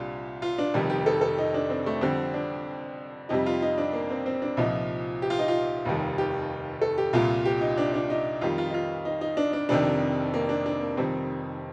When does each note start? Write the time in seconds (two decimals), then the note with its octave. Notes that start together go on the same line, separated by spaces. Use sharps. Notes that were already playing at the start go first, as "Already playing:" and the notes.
Already playing: C2 A#2 G3 D4 F4
0.42 F4
0.58 D4
0.74 F1 F2 D#3 G3
0.90 G4
1.06 A4
1.21 A4
1.38 D#4
1.54 D4
1.70 C4
1.86 A3
2.01 F2 D3 G3 C4
2.34 D4
3.29 F2 C3 G3 D#4
3.46 F4
3.62 D#4
3.78 D4
3.93 A#3
4.10 C4
4.26 C4
4.42 D4
4.57 C2 A#2 F3 D#4
5.22 G4
5.30 F4
5.39 D#4
5.48 F4
5.85 F1 D#2 D#3 G3
6.18 G4
6.81 A4
6.98 G4
7.13 C2 A#2 G3 F4
7.45 G4
7.61 D#4
7.77 D4
7.94 D4
8.10 D#4
8.41 F2 D#3 G3 F4
8.58 F4
8.69 D#4
8.74 F4
9.05 D#4
9.21 D#4
9.37 D4
9.53 D4
9.69 F1 F2 C3 D#3 D4
10.34 A#3
10.49 D4
10.66 D4
10.81 A#3
10.97 F1 F2 D#3 G3 C4